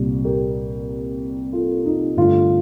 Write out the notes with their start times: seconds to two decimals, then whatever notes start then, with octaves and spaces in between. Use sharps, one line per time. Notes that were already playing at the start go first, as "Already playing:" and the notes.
Already playing: C2 A#2 G3
0.25 G4 A#4
1.53 F4 A4
1.85 D#4
2.17 G2 D3 A3 C4 F4